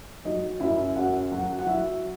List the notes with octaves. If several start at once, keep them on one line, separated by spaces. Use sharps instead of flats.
F#3 D#4 D#5
F#2 E4 E5
F#2 F#4 F#5
F#3 F#4 F#5
F#5
F#3 E4 E5